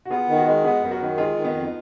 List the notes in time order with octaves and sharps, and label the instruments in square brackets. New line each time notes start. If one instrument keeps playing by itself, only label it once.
[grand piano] F#4
[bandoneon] B3 [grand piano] F4 G#4
[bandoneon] D#3
[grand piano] F#4 A#4
[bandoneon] G#3
[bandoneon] B3 [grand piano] G#4 B4
[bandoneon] F#2
[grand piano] F#4 A#4
[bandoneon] D#3
[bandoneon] G#3 [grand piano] F4 G#4
[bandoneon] D#3
[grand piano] B3 D#4
[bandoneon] F2